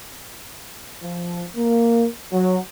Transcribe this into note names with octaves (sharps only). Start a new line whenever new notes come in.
F3
A#3
F#3